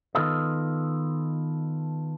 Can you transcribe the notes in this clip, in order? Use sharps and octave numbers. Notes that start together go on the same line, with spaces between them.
D#3 B3 F4 A4 D#5